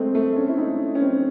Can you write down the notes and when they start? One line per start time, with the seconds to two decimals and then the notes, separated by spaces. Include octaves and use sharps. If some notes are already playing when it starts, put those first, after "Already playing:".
Already playing: G#3 A3 C4
0.15 A3
0.36 C#4
0.49 E4
0.58 D#4
0.95 C#4
1.01 C4